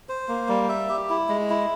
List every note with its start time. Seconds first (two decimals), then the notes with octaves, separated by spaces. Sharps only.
0.09 C5
0.28 A#3
0.49 G3
0.69 E5
0.89 G4
1.09 E4
1.29 G#3
1.50 E4